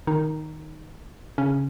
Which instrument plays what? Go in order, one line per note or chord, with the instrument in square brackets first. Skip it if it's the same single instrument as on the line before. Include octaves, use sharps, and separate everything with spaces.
[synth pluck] D#3 D#4
C#3 C#4